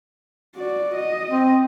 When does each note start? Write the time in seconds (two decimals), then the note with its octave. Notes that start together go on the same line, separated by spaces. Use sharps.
0.56 F#4 D5
0.95 D#5
1.32 C4